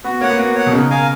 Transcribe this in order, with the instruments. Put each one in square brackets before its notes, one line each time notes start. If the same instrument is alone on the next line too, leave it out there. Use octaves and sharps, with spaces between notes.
[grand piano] B3 [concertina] F#4
[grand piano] A#3 [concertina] C#5 F#5
[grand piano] B3
[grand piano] A#3 [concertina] F#4
[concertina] C#5 F#5
[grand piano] B2
[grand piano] C#3 [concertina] D#4
[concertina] A#4 F5 G#5